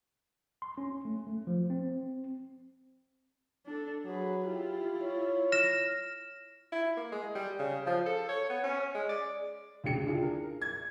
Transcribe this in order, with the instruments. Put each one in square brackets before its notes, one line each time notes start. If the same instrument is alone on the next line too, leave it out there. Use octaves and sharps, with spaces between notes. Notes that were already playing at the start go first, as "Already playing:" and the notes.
[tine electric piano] C6
C#4
A3
A3
F3
C4
[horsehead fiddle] D4 A4
[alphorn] F#3 [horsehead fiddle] G#4 B4
[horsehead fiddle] E4 F4 [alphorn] G4
[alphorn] C#5
[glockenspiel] F6 A#6 E7
[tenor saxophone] E4
A#3
G#3
G3
C#3
F3
A4
C#5
B3
C#4
G#3
D5
[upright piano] D2 C#3 D4 G#4 G5 C#7
D4 E4 F4 G#4
A#4
G#6